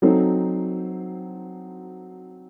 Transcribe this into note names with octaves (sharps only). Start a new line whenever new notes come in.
F#3 C4 D#4 A4 C5